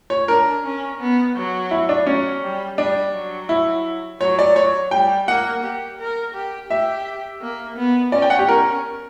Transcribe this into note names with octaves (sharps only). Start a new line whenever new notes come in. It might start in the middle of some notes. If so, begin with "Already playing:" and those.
C#5
D4 A#4
C#4
B3
F#3
E4
D4
F#3 C#4
G3
G3 D4
F#3
E4
F#3 C#5
D5
C#5
G3 G5
A#3 F#5
G4
A#4
G4
G4 E5
A#3
B3
C#4 D5
G5
F#5
G4
C#4 A#4